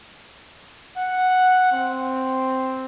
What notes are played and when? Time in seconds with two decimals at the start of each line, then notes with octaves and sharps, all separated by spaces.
0.97 F#5
1.72 C4